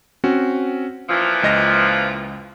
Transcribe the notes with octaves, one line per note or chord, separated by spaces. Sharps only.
C4 C#4 F#4
A#2 E3 F3 E6
C#2 D#5 A#6